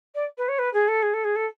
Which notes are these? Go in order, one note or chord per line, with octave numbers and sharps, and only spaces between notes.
D5
B4
C#5
B4
G#4
A4
G#4
A4
G#4
A4